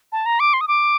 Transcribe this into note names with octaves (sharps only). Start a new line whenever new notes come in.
A5
A#5
D6
C6
D#6
D6